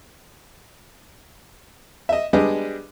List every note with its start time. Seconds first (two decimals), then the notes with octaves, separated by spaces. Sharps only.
2.09 D#5 E5
2.33 G3 G#3 B3 D4 D#5